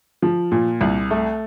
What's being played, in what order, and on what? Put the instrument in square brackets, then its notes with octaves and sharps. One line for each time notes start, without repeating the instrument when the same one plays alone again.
[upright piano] F3
A#2
C2
A3